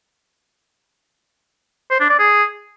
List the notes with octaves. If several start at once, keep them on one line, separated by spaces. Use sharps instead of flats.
C5
D4
D5
G#4